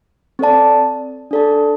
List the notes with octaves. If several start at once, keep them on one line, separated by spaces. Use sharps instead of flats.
C4 A4 D5 A5
D4 A4 D5 A5